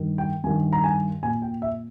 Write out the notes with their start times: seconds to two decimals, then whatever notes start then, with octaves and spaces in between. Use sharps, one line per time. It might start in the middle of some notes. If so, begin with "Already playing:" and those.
Already playing: G2 D#3
0.18 G5
0.44 G2 D#3 G#5
0.73 A#5
0.84 G#5
1.23 A#2 G#5
1.42 G5
1.62 E5